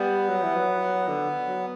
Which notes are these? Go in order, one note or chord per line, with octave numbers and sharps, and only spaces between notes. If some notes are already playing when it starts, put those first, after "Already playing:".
Already playing: G3 B3
F#3
E3
F#3
D3
F#3